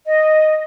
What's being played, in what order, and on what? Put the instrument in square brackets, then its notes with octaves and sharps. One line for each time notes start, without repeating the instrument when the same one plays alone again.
[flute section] D#5